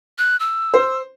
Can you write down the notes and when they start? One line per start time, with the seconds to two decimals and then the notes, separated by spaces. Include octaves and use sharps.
0.18 F#6
0.40 E6
0.74 C5